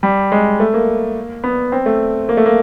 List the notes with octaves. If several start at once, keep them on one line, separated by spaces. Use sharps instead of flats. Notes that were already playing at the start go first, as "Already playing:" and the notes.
G3
G#3
A3
A#3
B3
C4
A3
A#3
A3
A#3